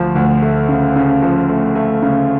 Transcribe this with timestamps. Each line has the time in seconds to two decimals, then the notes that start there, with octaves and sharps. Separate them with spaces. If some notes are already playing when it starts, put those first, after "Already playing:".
Already playing: D2 F3
0.15 D2
0.42 A3
0.69 C#3
0.96 C#3
1.22 F3
1.49 A3
1.75 A3
2.02 C#3